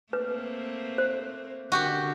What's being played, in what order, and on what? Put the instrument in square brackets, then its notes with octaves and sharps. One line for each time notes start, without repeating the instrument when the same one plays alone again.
[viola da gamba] A3 A#3 C4 [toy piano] B4
[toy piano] C5
[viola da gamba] D3 [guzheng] F#4 G4 G5